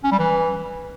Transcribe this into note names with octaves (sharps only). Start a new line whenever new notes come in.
C#4
G3
E3